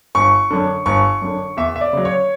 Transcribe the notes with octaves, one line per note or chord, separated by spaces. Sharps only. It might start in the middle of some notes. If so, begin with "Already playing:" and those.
G1 C#6
F#2 D3
G1 C#6
F#2 D3
E2 E5
E5
D5
C#3 F#3
C#5